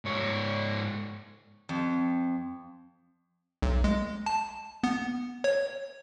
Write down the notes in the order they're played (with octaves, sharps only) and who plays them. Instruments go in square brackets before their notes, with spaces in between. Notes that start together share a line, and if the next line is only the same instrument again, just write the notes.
[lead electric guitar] G#2 C#5
[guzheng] F2
[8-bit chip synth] B1
G#3
A5
B3
C#5